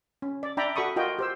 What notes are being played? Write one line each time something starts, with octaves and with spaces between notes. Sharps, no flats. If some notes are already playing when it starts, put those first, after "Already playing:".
C#4
D5
D4 D5 E5 G5 A#5 B5
F#4 A4 B5 C#6 D#6
F4 F#4 A#4 D#5 G5
G4 C5 E6